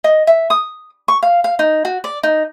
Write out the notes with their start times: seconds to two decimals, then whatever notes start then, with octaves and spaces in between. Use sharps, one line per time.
0.04 D#5
0.27 E5
0.50 D#6
1.08 C#6
1.23 F5
1.44 F5
1.59 D#4
1.85 F#4
2.04 D5
2.23 D#4